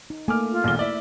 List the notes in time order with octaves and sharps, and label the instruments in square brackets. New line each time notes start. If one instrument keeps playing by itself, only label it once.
[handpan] D#4
[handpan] A3 A#3 A4 [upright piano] G#5 D6 F6
[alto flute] F4
[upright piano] B1 E2 G7
[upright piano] E4 D5 [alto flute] E5